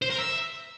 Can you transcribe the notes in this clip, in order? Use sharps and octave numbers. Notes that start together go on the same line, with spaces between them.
C5
A#4
E5